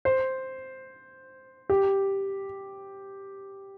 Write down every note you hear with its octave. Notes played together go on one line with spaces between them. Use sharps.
C5
G4